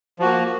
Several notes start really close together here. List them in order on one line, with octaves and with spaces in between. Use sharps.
F3 F#4 A#3